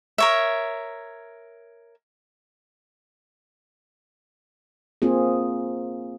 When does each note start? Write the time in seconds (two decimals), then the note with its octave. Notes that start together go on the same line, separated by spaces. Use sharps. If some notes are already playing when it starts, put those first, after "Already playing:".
0.18 A#4 C#5 E5
5.02 A#3 C4 F4 G#4